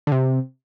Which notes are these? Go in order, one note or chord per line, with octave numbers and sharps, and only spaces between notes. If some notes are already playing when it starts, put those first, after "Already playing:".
D3
C3